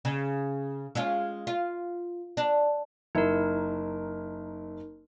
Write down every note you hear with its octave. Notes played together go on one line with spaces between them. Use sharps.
C#3
G#3 C#4 F4
F4
D4
F#1 D#4 E4 A#4